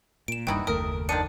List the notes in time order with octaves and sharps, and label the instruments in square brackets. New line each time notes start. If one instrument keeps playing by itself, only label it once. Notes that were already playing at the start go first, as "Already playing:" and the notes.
[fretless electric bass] A#2 [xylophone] D7 E7
[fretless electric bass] D#1 G2 [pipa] D#4 E4 F#4 [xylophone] G5
[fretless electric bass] F#1 D#2 A3 [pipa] A#4 [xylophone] D#6
[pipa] D#3 F3 D4 [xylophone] C#7 D#7